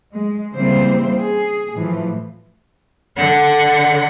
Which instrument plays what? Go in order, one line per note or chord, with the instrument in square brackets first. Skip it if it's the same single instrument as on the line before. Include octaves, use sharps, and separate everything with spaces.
[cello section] G#3
C#3 E3 G3 A#3 C4 C5
G#4
A2 E3 F3
[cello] D3 F#5